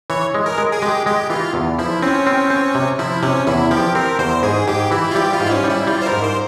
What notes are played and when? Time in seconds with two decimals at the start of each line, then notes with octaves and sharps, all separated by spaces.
0.10 E3 C#5
0.34 G#3
0.46 A#4
0.58 G#3
0.72 G#4
0.82 G#3 G4
1.06 G#3 G4
1.30 E3 F4
1.54 E2
1.79 F3 E4
2.02 C4 C#4
2.27 C4
2.50 C4
2.75 C3
2.99 F3 E4
3.22 C3 C#4
3.47 E2 E4
3.71 F3 G4
3.95 C4 A#4
4.19 E2 C5
4.43 G#2 G#4
4.67 G#2 G4
4.91 E3 E4
5.11 F4
5.15 G3 G4
5.33 F4
5.40 G#2
5.46 E4
5.51 C#4
5.64 G3
5.70 E4
5.87 G3 F4
6.02 C5
6.06 A#4
6.12 G#2
6.24 C5